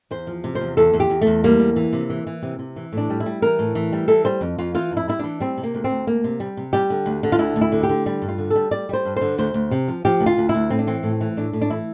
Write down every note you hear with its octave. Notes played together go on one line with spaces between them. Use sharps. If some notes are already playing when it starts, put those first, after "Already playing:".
E2 C5
F3
C3
C5
E2
E2 A4
E2
G4
E2
A3
E2
G3 A#3
E2
E3
C3
E3
E3
C3
C3
E3
A2 D4
G3
E4
G3
E3 A#4
A2
E3
G3
E3 A4
G3 C5
F2
F2 F4
E3 F4
F2
E4
G3 E4
E3 D4
G3 C4
C3
A#3
D2
C4
D2
D2 A#3
C3
G3
C3
G3 G4
D3
D2
D3
F4
D2 E4
D2
E4
D3
G4
D3
G3
G2
F4
D3
G3 A4
G3 D5
G3 C5
G2
D3 C5
D2 C5
D2
C3
F3
F3 G4
D2
F4
D2
E4
D2
A2 C4
D4
E3 C4
A2
E3
A2 D4
A2
D4
E3 E4